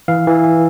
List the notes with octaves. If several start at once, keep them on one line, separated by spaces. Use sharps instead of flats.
E3 F5
E3
E3